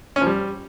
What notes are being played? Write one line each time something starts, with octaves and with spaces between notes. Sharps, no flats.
C#4
F3
G3